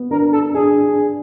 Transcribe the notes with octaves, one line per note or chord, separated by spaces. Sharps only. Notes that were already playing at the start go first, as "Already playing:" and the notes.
Already playing: B3
D4 A#4
A4
D4 G#4